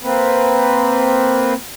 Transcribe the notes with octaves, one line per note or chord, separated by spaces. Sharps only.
A#3 C4 B4